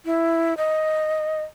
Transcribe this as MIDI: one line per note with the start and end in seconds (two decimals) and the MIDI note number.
0.05 0.54 64
0.57 1.41 75